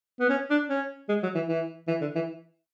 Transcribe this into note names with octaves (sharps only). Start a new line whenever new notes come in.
B3
C#4
D4
C#4
G#3
F#3
E3
E3
E3
D3
E3